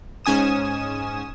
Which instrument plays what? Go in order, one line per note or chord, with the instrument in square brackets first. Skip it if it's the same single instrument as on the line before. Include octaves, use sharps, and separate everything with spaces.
[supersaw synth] G#2 C#4 G#5 D#6 E7